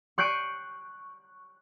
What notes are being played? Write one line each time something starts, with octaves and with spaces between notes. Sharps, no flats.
C#6 F#6 G6 C7 D7 D#7